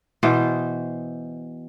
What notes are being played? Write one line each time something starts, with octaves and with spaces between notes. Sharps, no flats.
B2 E3 C5